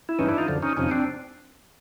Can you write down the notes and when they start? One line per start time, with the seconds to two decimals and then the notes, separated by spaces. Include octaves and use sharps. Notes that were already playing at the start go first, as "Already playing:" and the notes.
0.09 E4
0.19 G2 E3 C#4 D#4
0.28 D4 E4
0.38 D#4 F4
0.48 F#2 D3 F3
0.62 C#4 D#4
0.77 F2 C3 F3 C#4 D#4
0.91 C4 D4